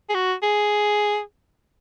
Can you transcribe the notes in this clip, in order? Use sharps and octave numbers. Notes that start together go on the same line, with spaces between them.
G#4
F#4
G#4